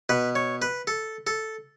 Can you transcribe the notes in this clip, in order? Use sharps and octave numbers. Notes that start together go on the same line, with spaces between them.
B2 B4
C#5
B4
A4
A4